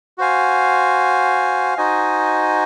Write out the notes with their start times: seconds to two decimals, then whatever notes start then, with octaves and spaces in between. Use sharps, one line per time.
0.18 F#4 C5 F5 G#5
1.78 D#4 F#4 C5 D#5 G#5